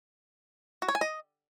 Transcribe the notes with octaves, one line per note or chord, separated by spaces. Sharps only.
F#4
C#5
G#5
D#5